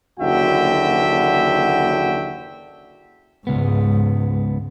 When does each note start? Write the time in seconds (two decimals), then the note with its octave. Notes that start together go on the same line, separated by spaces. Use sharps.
0.20 F#1 D#2 D3 F#4 E5 G5
3.47 C#2 G#2 B3